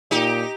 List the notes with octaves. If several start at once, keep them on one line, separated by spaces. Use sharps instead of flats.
A#2 D#4 G4